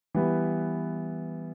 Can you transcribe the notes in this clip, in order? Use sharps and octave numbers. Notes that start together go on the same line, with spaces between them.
E3 G3 B3